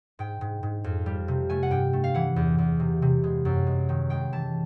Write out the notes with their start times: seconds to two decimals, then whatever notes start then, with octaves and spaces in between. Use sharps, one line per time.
0.19 G#2 G5
0.41 G#2
0.63 G#2
0.84 F2
1.06 G3
1.28 C3
1.49 A3 G#5
1.63 F#5
1.71 G2 G5
1.93 A3
2.04 F5
2.14 E3 F#5
2.36 E2
2.58 E2
2.80 C3
3.02 C3
3.24 G#3
3.45 F#2
3.67 G#3
3.89 D#3
4.10 G#3 G5
4.33 E3 A5